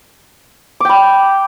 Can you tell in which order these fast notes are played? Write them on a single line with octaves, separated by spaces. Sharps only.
D6 G5 B5